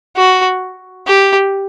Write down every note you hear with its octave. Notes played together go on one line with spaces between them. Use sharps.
F#4
G4